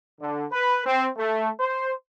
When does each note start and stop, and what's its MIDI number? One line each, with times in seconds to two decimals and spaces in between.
0.21 0.46 50
0.52 0.83 71
0.86 1.09 60
1.17 1.49 57
1.60 1.93 72